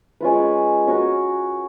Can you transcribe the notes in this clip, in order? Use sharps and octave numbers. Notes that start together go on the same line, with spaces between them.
G#3 C#4 F4 B4
C#4 F#4 A#4